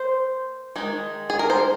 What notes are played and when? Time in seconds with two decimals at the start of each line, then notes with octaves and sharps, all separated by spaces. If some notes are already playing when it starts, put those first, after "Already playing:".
Already playing: A#3 C5
0.76 D#3 G#3 D#4
1.30 G#4
1.39 A#4
1.50 C5